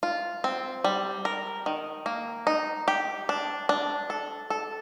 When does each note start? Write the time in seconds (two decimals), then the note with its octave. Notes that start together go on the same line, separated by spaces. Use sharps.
0.03 F4
0.44 C4
0.84 G3
1.25 A#4
1.66 D#3
2.06 A#3
2.47 D#4
2.88 G4
3.29 D4
3.69 D4
4.10 A4
4.50 A4